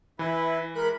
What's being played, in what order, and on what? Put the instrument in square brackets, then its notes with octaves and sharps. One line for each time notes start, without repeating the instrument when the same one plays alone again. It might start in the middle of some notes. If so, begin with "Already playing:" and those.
[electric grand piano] E3 [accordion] E4 B4 [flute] B5
[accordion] G#3 B5 F#6 [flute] A#4